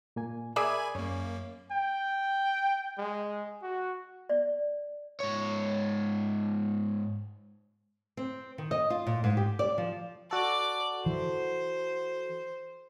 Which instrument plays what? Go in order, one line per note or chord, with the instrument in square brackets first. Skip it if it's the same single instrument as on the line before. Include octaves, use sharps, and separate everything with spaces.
[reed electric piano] A#2 A#3 G#5
[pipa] G#4 D5 E5 [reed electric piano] A#4 [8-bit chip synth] G#5 B5 G#6
[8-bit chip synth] F#2 A#3 [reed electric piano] C#5
[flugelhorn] G5
G#3
F#4
[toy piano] D5
[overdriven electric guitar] G#2 C#5
[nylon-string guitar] C4
D#3
D#5
F4
A#2
G#2
G4
D5
F3
[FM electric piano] F#4 A4 [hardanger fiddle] D5 D6
[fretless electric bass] E3 [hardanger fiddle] C5